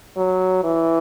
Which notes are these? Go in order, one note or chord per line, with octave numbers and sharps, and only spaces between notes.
F#3
E3